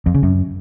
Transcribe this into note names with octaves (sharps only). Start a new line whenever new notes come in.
F2
C#3
F#2